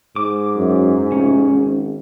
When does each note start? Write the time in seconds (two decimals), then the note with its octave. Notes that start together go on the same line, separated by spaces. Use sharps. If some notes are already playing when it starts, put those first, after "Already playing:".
0.16 G#2 D6
0.57 F#2
1.12 F1 C#4
1.51 G#1